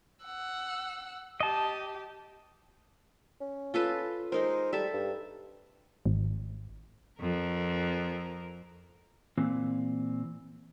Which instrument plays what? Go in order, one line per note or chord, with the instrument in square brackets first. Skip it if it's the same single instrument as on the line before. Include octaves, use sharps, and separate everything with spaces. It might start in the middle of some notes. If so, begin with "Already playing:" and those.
[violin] F#5 E6
[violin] G4 [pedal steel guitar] D#5 A5
[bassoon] C#4
[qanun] F4 A4 B4
[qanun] G#3 D#4 A#4 [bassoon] C5
[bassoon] G3 [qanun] A4 E5
[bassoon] G2
[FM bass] G#1
[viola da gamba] F2 A#4
[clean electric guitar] A#2 E3 C4